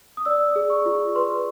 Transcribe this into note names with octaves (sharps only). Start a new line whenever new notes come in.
D#6
D5 E6
G#4
C#6
F4
B4 C6